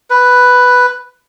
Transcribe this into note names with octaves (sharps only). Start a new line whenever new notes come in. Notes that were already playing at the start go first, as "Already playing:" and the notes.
B4